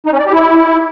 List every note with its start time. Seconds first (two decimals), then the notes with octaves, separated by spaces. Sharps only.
0.06 D#4
0.13 C#4
0.19 D5
0.26 G4
0.33 E4